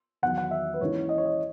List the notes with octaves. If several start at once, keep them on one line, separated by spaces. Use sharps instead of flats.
E2 D#3 F#3 F#5
F#5
E5
B4
G#2 E3 A#3 C#4 E4 C#5
D#5
C#5
D#5